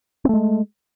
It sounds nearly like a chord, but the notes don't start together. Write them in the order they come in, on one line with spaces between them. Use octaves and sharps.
C4 A3 G#3